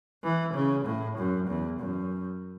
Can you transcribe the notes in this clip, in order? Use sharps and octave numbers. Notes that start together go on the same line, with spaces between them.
E3
C#3
A2
F#2
E2
F#2